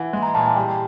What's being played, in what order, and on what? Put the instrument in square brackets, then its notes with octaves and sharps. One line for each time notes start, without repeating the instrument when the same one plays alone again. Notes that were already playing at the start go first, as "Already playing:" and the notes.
Already playing: [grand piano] E3 [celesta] F#5
[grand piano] G#3
[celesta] A#5
[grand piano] A#2 [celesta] A5
[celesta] G#5
[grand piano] G3 [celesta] G5